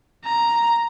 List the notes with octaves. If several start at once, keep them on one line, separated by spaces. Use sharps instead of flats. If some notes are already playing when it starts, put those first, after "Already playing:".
A#5